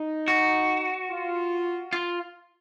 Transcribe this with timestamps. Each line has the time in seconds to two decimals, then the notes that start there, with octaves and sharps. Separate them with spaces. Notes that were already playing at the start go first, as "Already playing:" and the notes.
Already playing: D#4
0.28 F#4
1.10 F4
1.93 F4